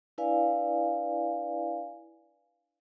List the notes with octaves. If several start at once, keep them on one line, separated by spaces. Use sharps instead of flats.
D4 E4 B4 D5 F5 G#5